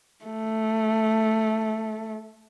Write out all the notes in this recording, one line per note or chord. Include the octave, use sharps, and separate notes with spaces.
A3